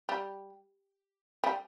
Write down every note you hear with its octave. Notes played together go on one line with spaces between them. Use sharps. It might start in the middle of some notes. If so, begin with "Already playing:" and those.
G3
G3